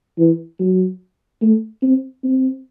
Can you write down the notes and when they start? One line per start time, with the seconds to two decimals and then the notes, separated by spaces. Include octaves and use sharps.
0.18 E3
0.59 F#3
1.42 A3
1.82 C4
2.24 C4